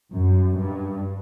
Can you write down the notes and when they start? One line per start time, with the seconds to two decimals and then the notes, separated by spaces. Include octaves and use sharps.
0.14 F#2
0.59 G2